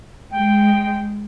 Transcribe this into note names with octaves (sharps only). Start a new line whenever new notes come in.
G#3 G5